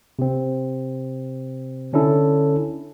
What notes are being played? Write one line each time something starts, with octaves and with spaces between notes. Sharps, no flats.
C3 C4
D3 C#4 D4 E4 A4